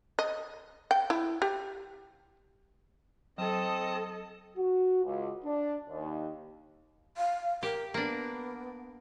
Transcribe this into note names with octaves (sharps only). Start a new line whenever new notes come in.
D#5
G5
E4
G4
F#3 C4 A4 D#5 A5 D#6
F#4
C#2
D4
D#2
F5
G4 A#4
A#3 B3 D4